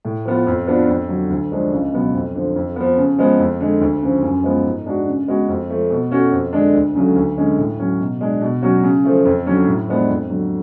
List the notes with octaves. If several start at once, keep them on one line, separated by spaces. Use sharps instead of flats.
A2
F3 B3 F4
F2
F3 B3 D4 F4
F2
D3 F#3
D2
D3 F3 G#3 D4
C#2
B2 F#3 B3
F2
D3 F3
F2
F3 B3
C#3
F3 G#3 B3
F2
D3 G#3
D2
C#3 F3
F#2
F3 G#3 B3 F4
G#2
G#3 D4 F#4
C#3
G#3 B3 F#4
F2
F3 A3
B2
A3 C#4 F#4
F2
D3 G#3 D4
D2
C#3 F#3 A3
D2
D3 G#3 C#4
A2
F#3 C#4
B2
G#3 D4
B2
F#3 C#4 F#4
C#3
F3 A3
F2
D3 F#3 C#4
A2
F3 G#3 B3 D4
F2
D3 F#3